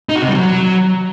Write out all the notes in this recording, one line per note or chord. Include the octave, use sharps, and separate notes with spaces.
D#4
F#4
C3
G3
F#3